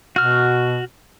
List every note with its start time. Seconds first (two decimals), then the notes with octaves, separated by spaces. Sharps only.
0.16 B2 F#4 F6